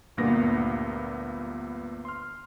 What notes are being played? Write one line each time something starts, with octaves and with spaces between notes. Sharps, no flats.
D2 G2 A#2 A#3 B3 A#6
C6 F6